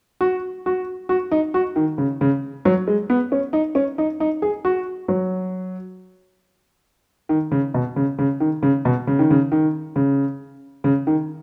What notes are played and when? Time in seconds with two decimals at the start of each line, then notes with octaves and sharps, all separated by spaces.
0.21 F#4
0.66 F#4
1.09 F#4
1.31 D#4
1.54 F#4
1.76 D#3
1.98 C#3
2.21 C#3
2.65 F#3
2.88 G#3
3.10 B3
3.32 C#4
3.53 D#4
3.75 C#4
3.98 D#4
4.20 D#4
4.42 G#4
4.65 F#4
5.08 F#3
7.29 D#3
7.51 C#3
7.74 B2
7.96 C#3
8.18 C#3
8.40 D#3
8.62 C#3
8.85 B2
9.07 C#3
9.19 D#3
9.30 C#3
9.52 D#3
9.96 C#3
10.84 C#3
11.07 D#3